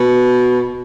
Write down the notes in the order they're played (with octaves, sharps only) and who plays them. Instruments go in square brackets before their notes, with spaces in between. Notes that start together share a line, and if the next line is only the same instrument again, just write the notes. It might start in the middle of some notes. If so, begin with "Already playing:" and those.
Already playing: [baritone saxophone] B2